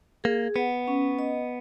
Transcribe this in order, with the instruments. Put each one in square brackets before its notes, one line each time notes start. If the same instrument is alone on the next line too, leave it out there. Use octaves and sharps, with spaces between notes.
[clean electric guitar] A#3 [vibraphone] G#4
[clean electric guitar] B3 [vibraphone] F#5
[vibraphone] C#4
D#5